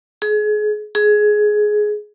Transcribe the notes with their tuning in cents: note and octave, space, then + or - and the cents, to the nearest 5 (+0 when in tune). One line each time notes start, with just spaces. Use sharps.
G#4 +30
G#4 +15